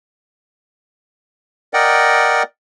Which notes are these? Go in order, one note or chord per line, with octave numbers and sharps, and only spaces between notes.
A#4 D5 D#5 F#5 G5